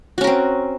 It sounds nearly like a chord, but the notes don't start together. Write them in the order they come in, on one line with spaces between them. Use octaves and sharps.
F#4 C#4 A#4 C4